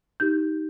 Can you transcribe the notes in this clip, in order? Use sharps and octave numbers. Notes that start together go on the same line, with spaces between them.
D#4 G4 G6